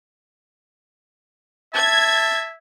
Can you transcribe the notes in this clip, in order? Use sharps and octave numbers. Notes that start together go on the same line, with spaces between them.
E5 A5 G#6